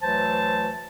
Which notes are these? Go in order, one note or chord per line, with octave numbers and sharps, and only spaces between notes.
D2 E3 F#3 C5 A5